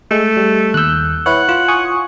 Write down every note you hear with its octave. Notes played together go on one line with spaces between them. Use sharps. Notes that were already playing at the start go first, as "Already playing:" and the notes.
G#3 A3
G3
D#2 E6 F#6 G6
E4 B4 C#5 F#5
F4
G#5 C#6 D#6